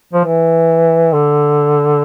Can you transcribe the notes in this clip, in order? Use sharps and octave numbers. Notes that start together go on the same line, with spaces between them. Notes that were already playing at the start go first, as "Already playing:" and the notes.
F3
E3
D3